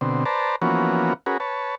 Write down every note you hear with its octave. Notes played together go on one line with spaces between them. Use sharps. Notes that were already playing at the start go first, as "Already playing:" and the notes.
B2 D3 C4
B4 C5 D5 A5 A#5
E3 F3 A#3 B3 C#4 F#4
C#4 F#4 G#4 A#4 B4
B4 C#5 A5